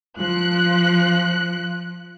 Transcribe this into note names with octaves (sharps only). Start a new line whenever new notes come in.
F3 F#6